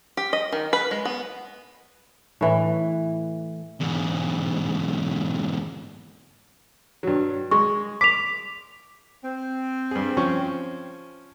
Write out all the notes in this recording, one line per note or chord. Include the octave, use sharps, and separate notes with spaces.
G4
D#5
D#3
B4
G#3
B3
A2 E3
E2 G#2
G2 F#3
G#3 C#6
D6 B6 F7
C4
G2 G#4
F3 C#4 C#6